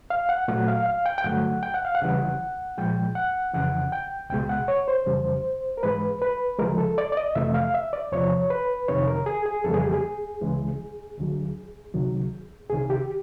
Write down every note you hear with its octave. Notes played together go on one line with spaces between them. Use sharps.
F5
F#5
A#2 F#3 A3 F#5
F5
F5
G5
G5
G2 D3 F#3 A3 F#5
G5
F#5
F5
F#5
D#2 C#3 E3 G3
A#2 F3 G#3 G5
F#5
F2 C#3 E3 F#5
G5
C#2 B2 G#3 G5
F#5
C#5
C5
F2 C#3 E3 G3
A#4
G#2 E3 G#3 B4
B4
D2 C#3 F3 G#3 A#4
A4
D5
D5
D#5
F2 C3 E3 A3 E5
F5
E5
D5
E2 C3 F3 C#5
B4
F2 C3 D#3 C#5
A#4
G#4
G#4
F2 C#3 E3 G3 A#3 A4
G#4
G4
G#4
C#2 C#3 E3 G#3
D2 D3 F#3
D2 C3 D#3 F#3
C2 C3 D#3 G#4
G4